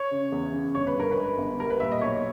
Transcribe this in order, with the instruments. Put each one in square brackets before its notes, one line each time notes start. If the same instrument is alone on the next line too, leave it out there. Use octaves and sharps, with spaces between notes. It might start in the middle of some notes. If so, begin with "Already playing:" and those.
Already playing: [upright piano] C#5
C#3
E2
C#3
G1 C#5
B4
G2 A#4
B4
G#3
G1
G3 A#4
B4
A#2 E5
D#5
B1 C#5